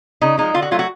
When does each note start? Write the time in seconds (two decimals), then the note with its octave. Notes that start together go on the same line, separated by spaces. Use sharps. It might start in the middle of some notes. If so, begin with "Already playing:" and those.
0.21 C#3 D#4
0.38 F3 G#3 D#4
0.54 D3 F4
0.62 F#4
0.71 F#3 A3 F4
0.79 F#4